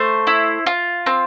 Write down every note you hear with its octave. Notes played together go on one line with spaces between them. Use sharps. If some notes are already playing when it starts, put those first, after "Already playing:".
Already playing: A3 C5
E4
F4
C4